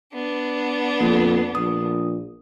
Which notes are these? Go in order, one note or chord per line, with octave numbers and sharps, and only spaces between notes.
B3 D4
F2 A#3
A#1 D#6